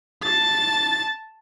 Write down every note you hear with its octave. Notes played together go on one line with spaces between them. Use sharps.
A5 A6